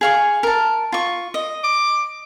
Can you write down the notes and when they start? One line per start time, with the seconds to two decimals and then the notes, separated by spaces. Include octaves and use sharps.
0.01 G#4 F5 C#6
0.43 A#4 A5
0.92 F4 C#6
1.34 D#5
1.64 D6